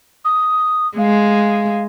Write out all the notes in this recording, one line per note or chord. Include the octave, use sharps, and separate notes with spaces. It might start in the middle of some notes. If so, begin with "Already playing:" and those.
D#6
G#3 F5